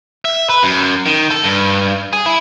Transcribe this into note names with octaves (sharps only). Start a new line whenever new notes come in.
E5
B4
F#2
D#3
A4
G2
G#4
E4